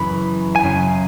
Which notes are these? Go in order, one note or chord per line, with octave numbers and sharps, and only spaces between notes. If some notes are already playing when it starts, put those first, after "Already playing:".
Already playing: F#2 C#3 E3 B5
G#5
F#2 C#3